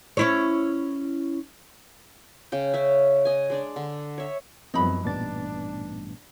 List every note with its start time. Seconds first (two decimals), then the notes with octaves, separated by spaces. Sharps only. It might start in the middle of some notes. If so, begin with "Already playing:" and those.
0.17 C#4 E4 C#5
2.52 C#3 G5
2.74 C#4 E5
3.25 D#5 G#5
3.50 G#3 D4 D5
3.76 D3
4.18 C#5 E5
4.74 F#2 F3 G3 B3 C4 D#4 B5
5.05 A1 G2 A#2 B3 D4 A6